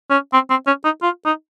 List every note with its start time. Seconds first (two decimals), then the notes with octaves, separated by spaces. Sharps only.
0.10 C#4
0.33 C4
0.50 C4
0.67 C#4
0.85 D#4
1.02 F4
1.25 D#4